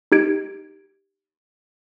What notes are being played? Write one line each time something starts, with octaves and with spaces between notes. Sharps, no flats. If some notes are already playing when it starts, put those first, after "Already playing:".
D#4 G4 G#6 D7